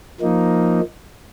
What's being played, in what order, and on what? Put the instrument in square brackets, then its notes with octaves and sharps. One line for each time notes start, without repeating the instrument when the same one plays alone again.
[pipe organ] F3 A#3 D#4